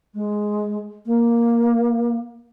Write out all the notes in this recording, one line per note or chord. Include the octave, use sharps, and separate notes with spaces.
G#3
A#3